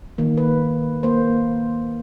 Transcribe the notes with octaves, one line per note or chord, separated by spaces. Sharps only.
D#3 A#3
B4
A#3 C5